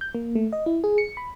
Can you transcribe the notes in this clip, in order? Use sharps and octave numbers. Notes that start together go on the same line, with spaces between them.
G6
A#3
A3
D#5
E4
G#4
C#7
B5